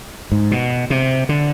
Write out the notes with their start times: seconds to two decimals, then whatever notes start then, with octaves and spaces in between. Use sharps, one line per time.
0.32 G#2
0.51 B2
0.90 C3
1.29 D3